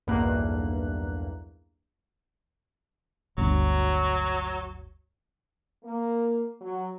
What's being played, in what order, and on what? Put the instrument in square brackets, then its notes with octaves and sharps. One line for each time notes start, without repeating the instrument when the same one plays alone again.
[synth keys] B1 E2 G2 A#3 F#6
[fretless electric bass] G1 D2 [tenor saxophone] F#3
[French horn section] A#3
F#3